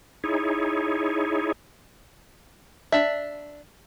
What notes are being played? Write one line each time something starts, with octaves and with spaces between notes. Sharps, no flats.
D#4 E4 G#4 C#5
D4 E5